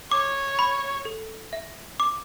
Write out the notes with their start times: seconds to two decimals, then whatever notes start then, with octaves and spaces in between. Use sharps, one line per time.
0.11 C#5 D6
0.59 B5
1.05 A4
1.53 E5
2.00 D6